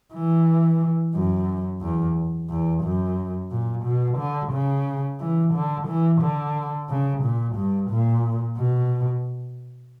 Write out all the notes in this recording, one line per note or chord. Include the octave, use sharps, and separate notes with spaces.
E3
F#2
E2
E2
F#2
A#2
B2
D3
C#3
E3
D3
E3
D3
C#3
A#2
G2
A#2
B2